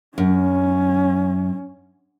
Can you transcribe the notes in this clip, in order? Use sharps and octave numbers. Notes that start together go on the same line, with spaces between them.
F#2 C#4